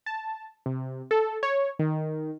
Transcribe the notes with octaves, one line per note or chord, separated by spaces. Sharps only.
A5
C3
A4
C#5
D#3